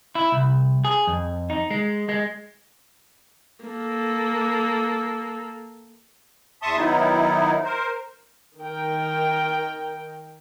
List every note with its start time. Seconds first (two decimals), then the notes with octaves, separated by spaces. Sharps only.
0.15 E4
0.32 C2
0.85 G#4
1.07 F2
1.50 D#4
1.71 G#3
2.09 G#3
3.65 A#3 A4
6.62 E2 E5 A5 C6 C#6 D#6
6.76 D#3 F#3 B3 D#4 E4
7.64 A#4 C5
8.59 D#3 A#4 G5